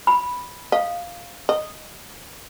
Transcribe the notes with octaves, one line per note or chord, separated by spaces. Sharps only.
B5
D#5 F5
D#5